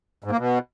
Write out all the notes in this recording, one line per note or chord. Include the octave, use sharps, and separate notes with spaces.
G#2
A#3
B2